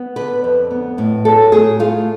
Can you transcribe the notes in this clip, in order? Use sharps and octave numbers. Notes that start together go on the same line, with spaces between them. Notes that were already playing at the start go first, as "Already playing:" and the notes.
Already playing: B3
D3 B4
F2
B3
A2
F#3 A4
A2 G#4
A3 F4